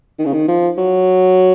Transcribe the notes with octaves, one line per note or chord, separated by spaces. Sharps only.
D#3
C#3
D#3
F3
F#3